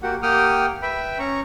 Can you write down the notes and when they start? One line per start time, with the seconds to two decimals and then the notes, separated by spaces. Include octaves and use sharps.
0.03 A#3 F#4 G4 F#5
0.23 A#3 G4 F#5 G5 D#6 F6
0.82 B4 E5 G5 B5
1.19 C#4 A#5 C#6